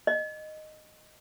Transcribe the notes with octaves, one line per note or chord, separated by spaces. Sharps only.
D#5